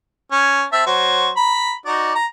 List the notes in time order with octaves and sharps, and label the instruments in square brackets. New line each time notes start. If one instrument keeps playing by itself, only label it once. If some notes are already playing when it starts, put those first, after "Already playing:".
[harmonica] C#4
C4 E5 A5
F#3 F#4 C5
A#5 B5
D#4 F#4 D5
A#5